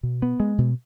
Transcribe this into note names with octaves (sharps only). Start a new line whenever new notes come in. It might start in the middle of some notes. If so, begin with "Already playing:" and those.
B2
B3
G#3
B2